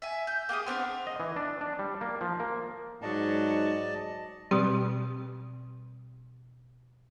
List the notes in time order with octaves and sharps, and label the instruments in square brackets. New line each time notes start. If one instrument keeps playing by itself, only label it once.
[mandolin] E5 G#5
G6
A#3 G4 G#4 D#6
B3 C4 D4 A#4
[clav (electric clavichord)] D#5
E3
D4
D4
G3
A#3
F3
A#3
[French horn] G#2 [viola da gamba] F#3 [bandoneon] D5 D#5 A5
[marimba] B2 C4 [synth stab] G3